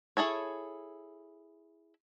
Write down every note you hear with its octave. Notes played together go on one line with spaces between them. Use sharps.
E4 G#4 A4 C#5